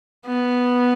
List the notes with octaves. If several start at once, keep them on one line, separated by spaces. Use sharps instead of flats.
B3